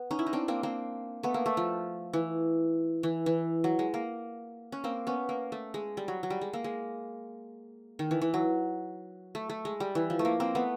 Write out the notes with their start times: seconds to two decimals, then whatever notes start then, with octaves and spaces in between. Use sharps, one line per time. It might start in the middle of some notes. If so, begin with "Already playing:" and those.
Already playing: B3
0.11 C#4 D#4
0.19 E4
0.26 D#4
0.33 C4 D4
0.48 A#3 C4
0.63 A#3 C4
1.23 A3 B3
1.34 A#3
1.46 A3
1.57 F3
2.13 E3
3.03 E3
3.26 E3
3.64 F#3
3.79 G#3
3.94 A#3
4.72 C#4
4.84 A#3 C4
5.07 B3 C#4
5.29 A#3
5.52 A3
5.74 G#3
5.97 G3
6.08 F#3
6.23 F#3
6.30 G3
6.41 G#3
6.53 A#3
6.64 G#3
7.99 D#3
8.11 E3
8.21 E3
8.34 F#3
9.35 A3
9.50 A3
9.65 G#3
9.80 G3
9.95 E3
10.10 F3
10.19 A3
10.25 A#3
10.40 A#3 C4
10.55 A3 B3